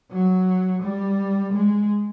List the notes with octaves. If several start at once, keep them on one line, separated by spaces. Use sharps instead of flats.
F#3
G3
G#3